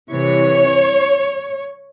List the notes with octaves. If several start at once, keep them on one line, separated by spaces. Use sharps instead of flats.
C3 E3 G3 C#5